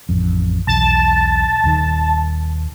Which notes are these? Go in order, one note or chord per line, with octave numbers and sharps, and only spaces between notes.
A1 F2
B1 E2 A5
D#1 D#2 D#3